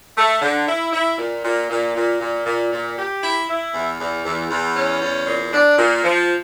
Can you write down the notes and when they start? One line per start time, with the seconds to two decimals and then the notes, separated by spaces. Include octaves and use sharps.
0.17 A3
0.42 D3
0.68 E4
0.93 E4
1.18 A#2
1.44 A#2
1.70 A#2
1.95 A#2
2.21 A#2
2.46 A#2
2.72 A#2
2.98 G4
3.23 E4
3.49 E4
3.74 E2
4.00 E2
4.25 E2
4.51 E2
4.76 C#4
5.02 E2
5.27 A#2
5.53 D4
5.78 A#2
6.04 F3